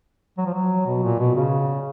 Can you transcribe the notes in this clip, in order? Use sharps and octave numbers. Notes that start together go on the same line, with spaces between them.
F#3
F3
F#3
B2
A#2
B2
C#3